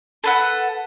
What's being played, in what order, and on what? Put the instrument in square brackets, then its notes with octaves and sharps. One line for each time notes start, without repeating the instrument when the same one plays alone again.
[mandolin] A4 B4 F#5